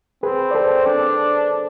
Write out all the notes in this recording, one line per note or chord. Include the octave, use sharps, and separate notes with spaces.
C4 G#4 B4
D5
A4 C5
D4